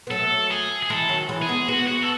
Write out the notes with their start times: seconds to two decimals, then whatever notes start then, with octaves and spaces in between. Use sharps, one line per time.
0.07 B3
0.11 F#3 A3 A4
0.51 G#4
0.83 G#4
0.90 E3 G#3 A4
1.09 D#3 F#3
1.29 E3 G#3
1.42 G#4
1.49 G#3 B3
1.68 G#3 B3 F#4
1.87 F#4
2.03 A4